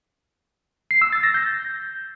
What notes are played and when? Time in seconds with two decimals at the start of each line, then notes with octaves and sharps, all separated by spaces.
0.91 C7
1.02 E6
1.13 A6
1.23 A#6
1.34 G6